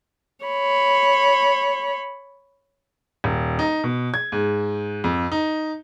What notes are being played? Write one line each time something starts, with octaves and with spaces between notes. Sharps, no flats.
C#5 B5
D#1
D#4
B2
G#6
G#2
F2
D#4